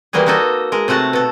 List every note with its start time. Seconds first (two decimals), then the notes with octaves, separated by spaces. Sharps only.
0.13 E3 G3 A#3 F#4 G#4
0.26 A#3 D#4 F#4 A4 D#5
0.72 G#3 A#4
0.88 C3 A3 F#4 F#5 A5
1.13 B2 A4